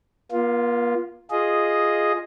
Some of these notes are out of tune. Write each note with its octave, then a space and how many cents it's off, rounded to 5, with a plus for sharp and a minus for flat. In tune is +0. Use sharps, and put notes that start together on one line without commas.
A#3 +45 F4 -5
F4 +0 G#4 +0 D#5 +0